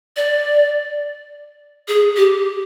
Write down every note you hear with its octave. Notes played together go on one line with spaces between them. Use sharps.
D5
G#4
G4